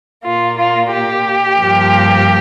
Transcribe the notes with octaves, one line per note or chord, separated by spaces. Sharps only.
A#2 A#3 F4
F4
G4
G2 F3 A#3